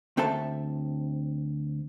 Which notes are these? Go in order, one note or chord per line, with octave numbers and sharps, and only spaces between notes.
D2 C4 A4 E5 A5